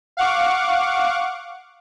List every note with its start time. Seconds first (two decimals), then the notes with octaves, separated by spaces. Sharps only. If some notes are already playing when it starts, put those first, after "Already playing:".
0.17 F5 F#5 C#6 D6